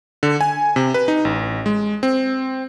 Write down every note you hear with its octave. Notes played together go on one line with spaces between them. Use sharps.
D3
G#5
C3
B4
D#4
A1
G#3
C4